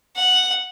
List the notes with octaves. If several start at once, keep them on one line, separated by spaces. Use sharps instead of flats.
F#5